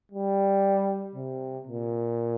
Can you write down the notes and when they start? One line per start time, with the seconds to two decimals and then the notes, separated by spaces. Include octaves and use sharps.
0.12 G3
1.15 C3
1.67 A#2